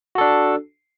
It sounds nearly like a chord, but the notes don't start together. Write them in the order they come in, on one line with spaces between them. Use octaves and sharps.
F#4 A4 D4